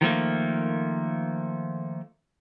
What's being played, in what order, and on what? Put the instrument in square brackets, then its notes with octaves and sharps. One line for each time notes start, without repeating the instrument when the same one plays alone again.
[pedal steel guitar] D#3 F3 A3 A#3